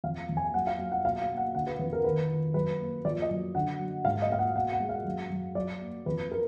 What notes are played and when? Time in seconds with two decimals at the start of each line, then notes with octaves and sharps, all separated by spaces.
0.04 F2 F5
0.29 F2
0.37 G#5
0.54 F#3 F#5
0.67 F5
0.79 F#3
0.92 F#5
1.04 B2 F5
1.22 F5
1.29 A#3
1.37 F#5
1.55 D3 F#5
1.67 B4
1.79 F2 B4
1.93 A#4
2.04 D#3 B4
2.29 D#3
2.54 F#2 B4
2.80 A#3
3.05 F3 D5
3.22 D#5
3.31 F#2
3.55 D3 F#5
3.80 F#3
4.05 G#2 F5
4.22 D#5
4.30 A#3 F5
4.39 F#5
4.55 B2 F#5
4.72 F#5
4.80 G#3
4.89 F5
5.05 F#2
5.30 F#2
5.55 F#3 D5
5.81 A#3
6.06 F2 B4
6.32 A#4